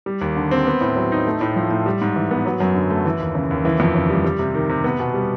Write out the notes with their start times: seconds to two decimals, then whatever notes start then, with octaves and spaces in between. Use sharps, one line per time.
0.06 G3
0.21 D#2
0.36 D3
0.51 C4
0.67 B3
0.81 A2
0.96 F#3
1.12 D#4
1.27 A3
1.41 A2
1.56 F3
1.71 A2
1.86 G3
2.01 G#2
2.16 E3
2.31 B3
2.46 F#3
2.60 F#2
2.75 D3
2.90 A3
3.05 E3
3.20 D#2
3.35 C#3
3.51 D#2
3.65 E3
3.80 F2
3.95 C#3
4.10 G3
4.24 G3
4.39 C3
4.55 D#3
4.69 C3
4.84 B3
5.00 B2
5.14 G3